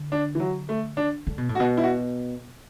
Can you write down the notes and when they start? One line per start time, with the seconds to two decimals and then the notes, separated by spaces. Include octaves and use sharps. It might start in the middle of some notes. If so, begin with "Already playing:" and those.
Already playing: D3
0.12 D4
0.35 E3
0.40 F#3
0.69 A3
0.97 D4
1.27 D3
1.38 B2
1.49 A2
1.55 F#4
1.60 B2
1.77 E4
1.84 F#4